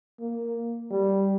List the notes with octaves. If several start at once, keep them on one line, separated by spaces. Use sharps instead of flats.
A#3
G3